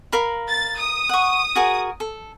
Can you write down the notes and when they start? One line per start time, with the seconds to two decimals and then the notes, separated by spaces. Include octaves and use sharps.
0.12 A#4 F5 B5
0.47 A6
0.77 D#6
1.09 F#5 C#6
1.56 F#4 G#4 A#4
2.00 A4